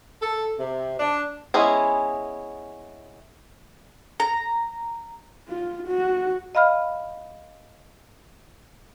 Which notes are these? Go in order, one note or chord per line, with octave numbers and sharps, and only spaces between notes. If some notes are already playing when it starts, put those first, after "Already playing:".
A4
C3
D4
G#3 B3 C#4 E4 G#4
A#5
F4
F#4
D#5 F5 B5 F6